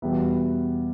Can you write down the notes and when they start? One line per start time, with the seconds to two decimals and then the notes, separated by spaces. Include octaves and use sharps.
0.02 E2 B2 G3 B3 E4